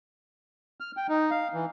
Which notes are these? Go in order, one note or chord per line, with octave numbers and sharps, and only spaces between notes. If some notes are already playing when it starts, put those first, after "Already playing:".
F6
G5
D#4
F5
E3